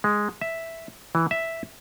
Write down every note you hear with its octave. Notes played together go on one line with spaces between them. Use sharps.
G#3
E5
E3
E5